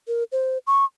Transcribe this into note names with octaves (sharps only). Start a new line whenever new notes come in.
A#4
C5
C#6